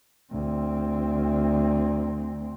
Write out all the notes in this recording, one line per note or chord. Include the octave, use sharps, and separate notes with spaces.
D2 C4